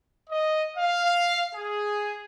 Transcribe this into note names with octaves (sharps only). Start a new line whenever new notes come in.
D#5
F5
G#4